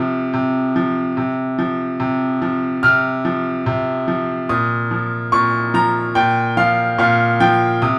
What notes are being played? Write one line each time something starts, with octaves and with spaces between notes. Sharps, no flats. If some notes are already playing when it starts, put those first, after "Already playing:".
Already playing: C3 F3
C3
F3
C3
F3
C3
F3
C3 F6
F3
C3
F3
A#2 D#6
F3
A#2 C#6
F3 A#5
A#2 G5
F3 F5
A#2 F5
F3 G5
C3 D#6